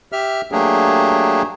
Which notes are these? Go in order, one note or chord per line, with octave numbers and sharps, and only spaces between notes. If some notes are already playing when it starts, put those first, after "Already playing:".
G4 E5 F6
F#3 A3 A#3 D4 G4 G#4